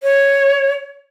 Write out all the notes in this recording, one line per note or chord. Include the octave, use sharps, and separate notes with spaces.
C#5